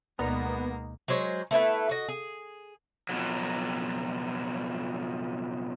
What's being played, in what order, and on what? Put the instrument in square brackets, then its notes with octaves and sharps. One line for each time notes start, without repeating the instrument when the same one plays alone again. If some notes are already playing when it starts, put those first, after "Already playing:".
[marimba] D2 B2 D5 [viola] G#3 A#3 [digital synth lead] B3 [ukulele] D#4 A#4
[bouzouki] F#3 G#3 C5 C#5
A3 B3 E4 B4
F#4 D#5
G#4
[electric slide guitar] F2 B2 F#3